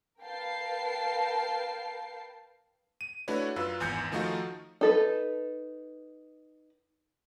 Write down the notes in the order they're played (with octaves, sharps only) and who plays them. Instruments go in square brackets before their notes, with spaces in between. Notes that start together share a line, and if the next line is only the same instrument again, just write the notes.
[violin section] A#4 B4 F5 G5 A5 C7
[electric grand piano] D#7
A3 D4 E4 F#4 B4 C#5
F#2 F4 B4 E6
G#1 E2 G#5 G6 C#7
D#3 F3 A3 D#4 F4 F#4
[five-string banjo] D#4 A4 B4